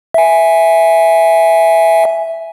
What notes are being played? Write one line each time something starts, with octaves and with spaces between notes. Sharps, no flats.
E5 G#5